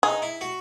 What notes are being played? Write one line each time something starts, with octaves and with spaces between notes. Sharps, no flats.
D#4 G#4
E4
F#4